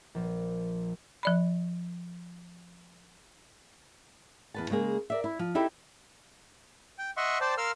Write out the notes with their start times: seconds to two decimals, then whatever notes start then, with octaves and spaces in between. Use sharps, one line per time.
0.15 A#1 F3
1.23 F3 D5 B5
4.54 E2 B4 A5
4.70 C#3 G#3 A#3 G#4
5.10 A#4 D5 E5
5.24 E4
5.39 F3
5.55 D#4 E4 G4 A4
6.98 G5
7.17 D#5 E5 F#5 C6 C#6
7.41 C5 D5 G5 A5
7.58 A#4 F5 C6 E6 F6